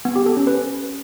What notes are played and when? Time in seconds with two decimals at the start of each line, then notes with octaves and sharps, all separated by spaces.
0.05 B3
0.16 G4
0.26 A4
0.37 C#4
0.47 B4